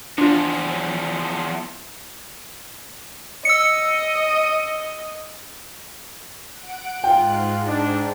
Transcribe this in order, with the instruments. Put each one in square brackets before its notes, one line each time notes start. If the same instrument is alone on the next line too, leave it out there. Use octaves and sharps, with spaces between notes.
[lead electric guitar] E2 F3 [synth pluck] D4 F4
[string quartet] D#5 [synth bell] E6 C#7
[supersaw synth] F#5 D7
[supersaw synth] G#2 F#6 [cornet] F4 [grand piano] G5
[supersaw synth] G#2
[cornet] D4